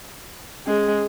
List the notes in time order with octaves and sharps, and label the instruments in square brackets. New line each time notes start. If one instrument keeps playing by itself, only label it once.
[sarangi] G#3 [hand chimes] C#4 G#4